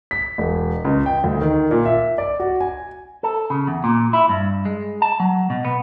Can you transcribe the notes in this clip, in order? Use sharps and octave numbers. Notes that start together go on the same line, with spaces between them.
B6
E1
C#2
G5
D2
D#3
A#2
E5
D5
F#4
G#5
A4
C#3
E2
A#2
E4
G2
G#3
A5
F#3
B2
B3